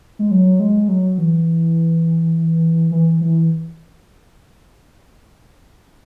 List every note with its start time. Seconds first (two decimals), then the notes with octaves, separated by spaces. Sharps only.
0.19 G#3
0.31 F#3
0.60 G#3
0.88 F#3
1.18 E3
2.91 E3
3.21 E3